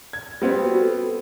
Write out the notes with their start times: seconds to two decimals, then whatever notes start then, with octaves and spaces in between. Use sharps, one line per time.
0.13 G#6
0.42 G3 B3 C4
0.63 F#4
0.81 A4